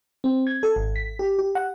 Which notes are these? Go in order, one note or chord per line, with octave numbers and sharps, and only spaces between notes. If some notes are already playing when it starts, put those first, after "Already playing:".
C4
G#6
A4
G#1
B6
G4
G4
F#5